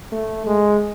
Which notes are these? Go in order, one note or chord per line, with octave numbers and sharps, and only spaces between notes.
A3
G#3